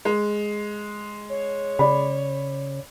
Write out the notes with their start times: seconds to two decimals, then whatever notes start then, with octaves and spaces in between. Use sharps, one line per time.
0.05 G#3
1.29 C#5
1.79 C#3 D5 B5